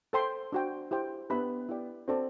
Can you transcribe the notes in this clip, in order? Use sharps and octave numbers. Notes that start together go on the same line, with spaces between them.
A4 C5 G5 C6
D4 F#4 C5 G5
E4 G4 C5 G5
B3 D4 G4 B4 E5 B5
E4 G4 D5 G5
C4 F#4 A4 D5 A5